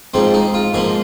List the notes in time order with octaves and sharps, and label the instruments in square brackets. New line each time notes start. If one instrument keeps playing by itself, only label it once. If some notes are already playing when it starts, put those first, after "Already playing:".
[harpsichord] G#2 F3 A#3 C4
D#4
F4
G#2 F3 A#3 G#4